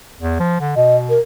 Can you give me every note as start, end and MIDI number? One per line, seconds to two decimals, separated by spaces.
0.20 0.38 40
0.40 0.59 53
0.60 0.73 50
0.76 1.17 47
0.76 0.97 75
1.09 1.19 70